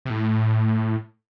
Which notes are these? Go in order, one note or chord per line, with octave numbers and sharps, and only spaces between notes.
C3
A2